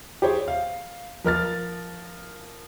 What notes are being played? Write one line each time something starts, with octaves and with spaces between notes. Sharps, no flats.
G4 G#4 C5 C#5
F5
F3 A#4 F6 A6